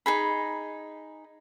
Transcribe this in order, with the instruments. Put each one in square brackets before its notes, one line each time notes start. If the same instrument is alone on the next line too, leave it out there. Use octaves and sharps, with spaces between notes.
[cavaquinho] D#4 G#4 B5